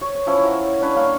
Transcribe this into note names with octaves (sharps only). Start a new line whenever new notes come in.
C#5 C#6
E3 F3 C#4 E4
A#4 E5 F#5
C#4 D4 B4 C#5
G3 A#3 F5 C#6